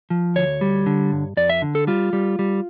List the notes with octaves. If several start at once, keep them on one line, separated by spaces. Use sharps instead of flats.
F3
D2 C#5
G3
D3
G2
F2 D5
E5
D3
A4
G3 F4
G3
G3